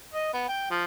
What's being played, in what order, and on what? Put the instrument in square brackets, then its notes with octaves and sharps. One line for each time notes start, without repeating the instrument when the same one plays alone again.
[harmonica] D#5
B3
G5
F3